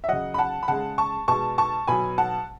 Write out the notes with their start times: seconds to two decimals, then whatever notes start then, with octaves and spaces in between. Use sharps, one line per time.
0.04 E5
0.08 C#3 F#3 D#5 F#5
0.34 B5
0.38 F#5 A5
0.63 B5
0.68 C#3 G#3 F#5 A5
0.98 A5 C#6
1.28 B2 G#3 A5 C#6
1.58 A5 C#6
1.87 B2 F#3 G#5 B5
2.18 F#5 A5